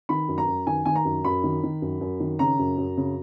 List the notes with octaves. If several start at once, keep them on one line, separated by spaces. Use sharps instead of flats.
D#3 B5
F#2
A#5
F#2
D#3 G#5
D#3 G#5
A#5
F#2
F#2 B5
D#3
D#3
F#2
F#2
D#3
C#3 A#5
F#2
F#2
C#3